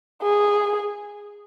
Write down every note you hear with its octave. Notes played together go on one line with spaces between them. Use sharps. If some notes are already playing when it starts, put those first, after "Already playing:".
G#4